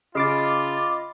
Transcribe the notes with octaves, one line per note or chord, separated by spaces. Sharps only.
C#3 F4 D#5 B5 D6 F6 A6 C7